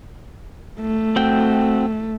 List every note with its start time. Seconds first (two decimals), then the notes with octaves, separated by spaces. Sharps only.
0.80 A3
1.16 C4 F#4 G5